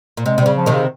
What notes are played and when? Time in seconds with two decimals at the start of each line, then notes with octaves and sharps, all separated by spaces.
0.17 A#2
0.26 C3 G#3
0.38 C3
0.41 C#3 G3
0.57 F3
0.66 C3 D#3
0.73 C#3